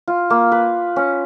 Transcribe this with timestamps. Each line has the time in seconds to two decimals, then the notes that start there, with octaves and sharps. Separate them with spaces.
0.08 F4
0.30 A#3
0.52 B4
0.96 C#4